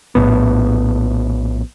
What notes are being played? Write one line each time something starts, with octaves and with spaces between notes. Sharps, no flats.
A#1 E2 A2 B3